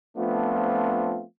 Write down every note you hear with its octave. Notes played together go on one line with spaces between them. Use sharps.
F3 A3 B3 C4 D4 F4